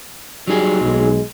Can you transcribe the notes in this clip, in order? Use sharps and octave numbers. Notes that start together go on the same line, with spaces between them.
F#3 G3 D#4 G#4
B1 G#3